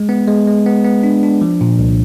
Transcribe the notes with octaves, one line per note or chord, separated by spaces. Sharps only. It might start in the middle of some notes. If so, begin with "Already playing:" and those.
Already playing: G#3
B3
G#3
G#3
B3
B3
D4
D4
F3
A#2
C2